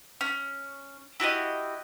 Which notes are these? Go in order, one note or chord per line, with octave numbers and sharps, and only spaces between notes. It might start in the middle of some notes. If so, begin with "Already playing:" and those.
C#4
E4 F#4 G4 D#5